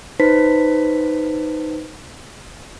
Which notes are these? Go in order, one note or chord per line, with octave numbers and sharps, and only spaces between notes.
D#4 B4 C5 B6